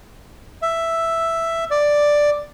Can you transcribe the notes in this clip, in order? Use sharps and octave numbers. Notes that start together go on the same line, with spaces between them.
E5
D5